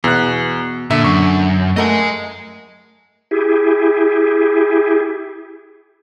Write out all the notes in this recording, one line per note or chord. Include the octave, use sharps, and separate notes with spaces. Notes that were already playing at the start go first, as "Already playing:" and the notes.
E2 B2 F#6
A#2 D3 E5
F#2 C#6
A3 A#4 D#5 F#5 G#5
E4 G4 G#4